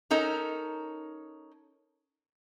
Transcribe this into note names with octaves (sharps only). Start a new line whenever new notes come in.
C#4 D#4 A4 A#4